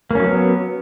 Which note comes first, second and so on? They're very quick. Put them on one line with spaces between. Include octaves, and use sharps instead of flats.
A#3 C#4 F#3 B3